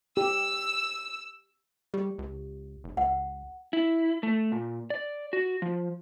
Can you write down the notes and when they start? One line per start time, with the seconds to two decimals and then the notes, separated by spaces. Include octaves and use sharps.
0.17 G4 E6
1.94 G3 G4
2.19 C#2
2.84 F1
2.97 C#2 F#5
3.73 E4
4.23 A3
4.52 A#2
4.90 D5
5.33 F#4
5.62 F3